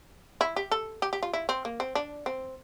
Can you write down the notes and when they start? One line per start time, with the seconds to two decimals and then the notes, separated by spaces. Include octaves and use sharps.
0.41 E4
0.56 G4
0.71 A4
1.02 G4
1.13 G4
1.23 F4
1.33 E4
1.49 C4
1.65 A#3
1.80 C4
1.95 D4
2.26 C4